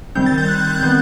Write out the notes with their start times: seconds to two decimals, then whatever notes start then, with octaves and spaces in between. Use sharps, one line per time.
0.15 D#3 G3 C4 G6
0.26 A6
0.38 G6
0.48 F#6
0.74 F#6
0.81 D#3 G3 B3 G6